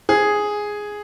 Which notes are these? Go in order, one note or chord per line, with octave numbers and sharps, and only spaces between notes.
G#4